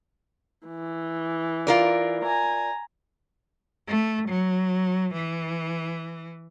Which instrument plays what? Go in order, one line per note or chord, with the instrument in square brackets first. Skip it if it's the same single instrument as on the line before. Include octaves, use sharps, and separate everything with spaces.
[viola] E3
[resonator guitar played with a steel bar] F4 A#4 D5
[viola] G#5 A#5
[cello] A3
F#3
E3